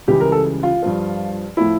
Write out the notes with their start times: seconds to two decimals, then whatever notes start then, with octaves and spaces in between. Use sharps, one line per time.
0.08 C#2 C#3 E3 G3 G4
0.20 A#4
0.32 A4
0.63 F4
0.82 G2 F3
1.57 A2 F3 E4